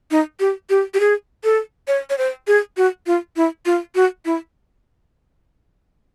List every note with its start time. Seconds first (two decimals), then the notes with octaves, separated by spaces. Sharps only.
0.11 D#4
0.40 G4
0.70 G4
0.94 G4
1.00 G#4
1.44 A4
1.88 C#5
2.10 C#5
2.18 C5
2.47 G#4
2.77 F#4
3.07 F4
3.36 E4
3.66 F4
3.95 F#4
4.25 E4